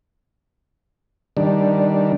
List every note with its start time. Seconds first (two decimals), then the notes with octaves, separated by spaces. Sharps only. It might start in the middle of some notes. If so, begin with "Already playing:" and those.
1.37 D#3 G3 D4